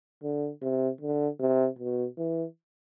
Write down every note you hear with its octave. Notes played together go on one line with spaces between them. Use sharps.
D3
C3
D3
C3
B2
E3